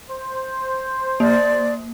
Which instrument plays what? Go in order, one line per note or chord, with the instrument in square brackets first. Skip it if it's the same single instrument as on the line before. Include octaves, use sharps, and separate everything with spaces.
[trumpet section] C5
[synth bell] A#3 [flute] D5